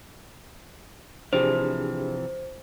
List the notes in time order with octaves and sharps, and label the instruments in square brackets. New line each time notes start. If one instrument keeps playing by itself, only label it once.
[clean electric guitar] C3 E3 F3 [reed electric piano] D4 G4 G#4 [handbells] C5